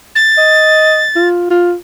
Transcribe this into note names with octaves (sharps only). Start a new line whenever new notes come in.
A6
D#5
F4
F4